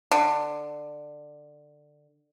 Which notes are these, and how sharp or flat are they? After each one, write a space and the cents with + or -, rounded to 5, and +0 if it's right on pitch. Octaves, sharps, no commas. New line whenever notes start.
D3 +15